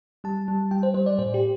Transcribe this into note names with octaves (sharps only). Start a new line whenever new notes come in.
G3 A5
G3
G3 G5
C5
G3 C5
D5
A2 C5
G4